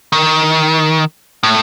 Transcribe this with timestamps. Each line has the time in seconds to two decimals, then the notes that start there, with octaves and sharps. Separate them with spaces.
0.12 D#3
1.43 A2